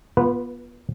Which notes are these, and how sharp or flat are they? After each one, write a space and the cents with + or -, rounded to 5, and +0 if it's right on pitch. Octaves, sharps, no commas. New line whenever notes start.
B3 -30 F4 +0 B4 +0